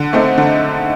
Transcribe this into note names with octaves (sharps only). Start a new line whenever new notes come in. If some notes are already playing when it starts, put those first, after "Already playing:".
Already playing: D3
A3 C4 D#4
D3